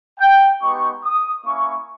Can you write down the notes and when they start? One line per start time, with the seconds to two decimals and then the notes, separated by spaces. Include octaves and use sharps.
0.19 G5
0.60 G#3 B3 D#4 G4 C#6
1.03 D#6
1.44 A#3 C#4 E4 C#6